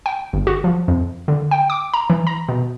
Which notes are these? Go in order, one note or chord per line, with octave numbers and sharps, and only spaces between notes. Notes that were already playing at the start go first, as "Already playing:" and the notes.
G5
G1
F#4
F3
F2
D3
G5
D6
A#5
E3
A#5
B2